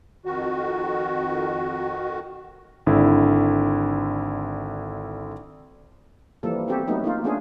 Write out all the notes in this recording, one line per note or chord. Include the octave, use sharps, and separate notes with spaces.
F2 D#3 F#4
G#1 D3 E4
E3 F3 G3 A#3 A4
B3 C4 F#4 G4 A4
F#3 A3 B3 D#4
A#3 D#4 F4
A3 B3 C#4 D4 F4 G#4